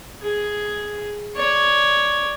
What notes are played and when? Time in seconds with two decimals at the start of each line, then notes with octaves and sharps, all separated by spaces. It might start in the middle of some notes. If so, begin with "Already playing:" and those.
0.22 G#4
1.36 C#5 D5